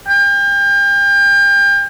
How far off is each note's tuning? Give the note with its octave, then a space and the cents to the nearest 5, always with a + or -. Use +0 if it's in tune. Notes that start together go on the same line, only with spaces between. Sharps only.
G5 +35